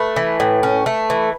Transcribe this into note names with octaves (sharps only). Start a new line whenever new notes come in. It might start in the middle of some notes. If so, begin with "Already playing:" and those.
Already playing: A3 B4
E3
A2
C#4
A3
E3